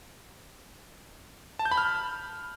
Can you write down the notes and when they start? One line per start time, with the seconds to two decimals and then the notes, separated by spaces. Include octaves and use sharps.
1.59 A5
1.65 G6
1.71 B5
1.78 F6